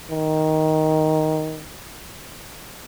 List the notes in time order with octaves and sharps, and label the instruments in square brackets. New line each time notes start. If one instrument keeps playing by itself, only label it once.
[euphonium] D#3